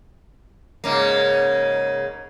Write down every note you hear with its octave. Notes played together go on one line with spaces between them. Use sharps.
G#2 C#3 A#3